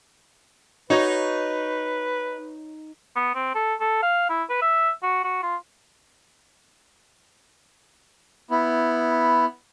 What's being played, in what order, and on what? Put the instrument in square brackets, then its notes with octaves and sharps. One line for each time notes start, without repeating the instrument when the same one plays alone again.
[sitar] D#4 [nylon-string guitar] F#4 C#5 [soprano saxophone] B4
[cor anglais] B3
C4
A4
A4
F5
E4
B4
E5
F#4
F#4
F4
[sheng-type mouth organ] B3 E4